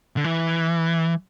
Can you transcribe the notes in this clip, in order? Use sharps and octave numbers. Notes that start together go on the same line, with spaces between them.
D3
E3